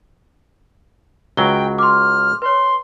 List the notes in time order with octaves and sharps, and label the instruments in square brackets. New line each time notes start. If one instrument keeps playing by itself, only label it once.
[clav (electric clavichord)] C#2 F#3 [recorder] G5 [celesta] G7
[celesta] C6 D6 [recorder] F6
[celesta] B4 C#5 [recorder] C6